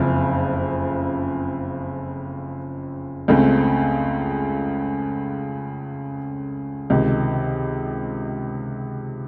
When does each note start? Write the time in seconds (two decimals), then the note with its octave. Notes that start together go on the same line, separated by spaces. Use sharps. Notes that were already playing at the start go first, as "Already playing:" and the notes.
Already playing: F#1 F2 C#3
3.28 C#2 C#3 A3 C4
6.90 C#2 C3 D#3